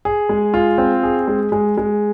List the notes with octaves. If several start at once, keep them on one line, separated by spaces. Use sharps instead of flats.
G#4
G#3
F4
C4
G#4
G#3
G#3
G#3